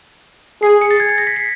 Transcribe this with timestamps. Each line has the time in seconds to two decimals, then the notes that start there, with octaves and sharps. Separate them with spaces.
0.62 G#4 C7
0.82 C#7
0.91 A6
1.00 G#6
1.09 A6
1.18 A#6
1.27 B6
1.36 C7